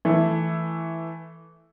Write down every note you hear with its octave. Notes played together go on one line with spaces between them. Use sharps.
E3 A3